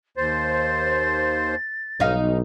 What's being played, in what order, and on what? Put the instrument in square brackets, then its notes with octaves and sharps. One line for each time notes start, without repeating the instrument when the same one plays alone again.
[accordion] D#2 C5 [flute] A6
[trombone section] B1 [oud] D#4 F5